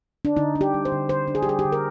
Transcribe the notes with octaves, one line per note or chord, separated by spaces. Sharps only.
D4
D3 D#4
D4
G4
G3
C5
D3
D3 C5
D4
G#4
G4
G3 G#4
G4
D3
A#4